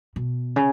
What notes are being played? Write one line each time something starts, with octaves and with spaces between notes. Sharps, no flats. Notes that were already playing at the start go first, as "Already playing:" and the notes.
B2
C#3